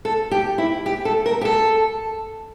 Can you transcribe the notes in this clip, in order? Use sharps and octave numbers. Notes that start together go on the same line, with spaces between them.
A4
G4
E4
G4
A4
A#4
G4
A4